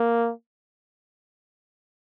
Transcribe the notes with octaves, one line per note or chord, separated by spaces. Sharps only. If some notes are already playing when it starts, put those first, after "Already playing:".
Already playing: A#3